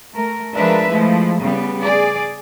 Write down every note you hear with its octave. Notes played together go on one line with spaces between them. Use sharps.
A3 A#4
F3 G#3 D4 A#4 B4 E5
F3 G#3 A3 E4
C#3 G3 B3
G#4 D5